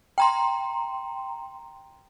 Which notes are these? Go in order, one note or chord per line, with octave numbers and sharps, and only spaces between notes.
G5 A#5 C6